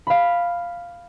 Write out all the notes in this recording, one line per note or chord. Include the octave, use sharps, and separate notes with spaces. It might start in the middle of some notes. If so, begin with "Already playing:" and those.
F5 B5